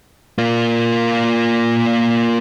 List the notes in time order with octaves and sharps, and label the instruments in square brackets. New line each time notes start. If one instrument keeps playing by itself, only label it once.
[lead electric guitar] A#3 F4